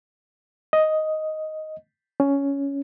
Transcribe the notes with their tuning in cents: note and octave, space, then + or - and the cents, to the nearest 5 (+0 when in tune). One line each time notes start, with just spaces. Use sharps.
D#5 +5
C#4 +10